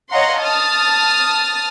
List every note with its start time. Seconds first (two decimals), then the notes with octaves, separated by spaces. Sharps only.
0.11 C#5 D#5 F5 F#5 A#5 C6
0.40 A5 D#6 F6 A6